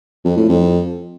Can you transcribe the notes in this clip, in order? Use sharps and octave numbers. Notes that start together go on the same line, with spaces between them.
F2
A2
F2